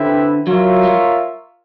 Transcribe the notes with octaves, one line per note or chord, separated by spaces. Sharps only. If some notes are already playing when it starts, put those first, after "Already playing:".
Already playing: D3 C4 E4 G4 B4 E5
F#3 F4 A#4 C#5 E5
G3